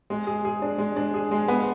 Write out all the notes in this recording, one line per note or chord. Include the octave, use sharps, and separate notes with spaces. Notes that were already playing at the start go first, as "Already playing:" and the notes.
G#3
G#4
G#4
D4
G#3
D4
G#4
G#3
B3